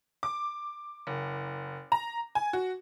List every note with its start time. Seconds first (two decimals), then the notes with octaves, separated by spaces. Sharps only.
0.23 D6
1.07 F#1
1.92 A#5
2.35 G#5
2.53 F#4